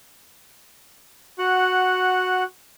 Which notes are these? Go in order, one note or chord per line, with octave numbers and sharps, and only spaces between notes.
F#4 F#5